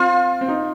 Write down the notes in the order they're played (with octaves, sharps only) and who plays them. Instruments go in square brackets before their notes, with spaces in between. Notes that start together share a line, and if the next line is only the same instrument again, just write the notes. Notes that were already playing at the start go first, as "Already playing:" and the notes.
Already playing: [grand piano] C4 [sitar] F4
[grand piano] C4
D#4